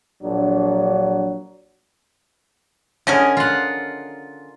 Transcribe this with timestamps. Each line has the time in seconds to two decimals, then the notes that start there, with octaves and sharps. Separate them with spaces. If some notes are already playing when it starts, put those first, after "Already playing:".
0.23 A#1 F#3 D4
3.07 D3 C#4 G#4 A#4 D#5
3.37 F4 F#5